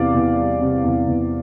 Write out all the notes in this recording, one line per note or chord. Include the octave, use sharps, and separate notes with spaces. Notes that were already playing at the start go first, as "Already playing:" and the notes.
Already playing: E2 C3 D5 F5
E2
G3
C3
E2
E2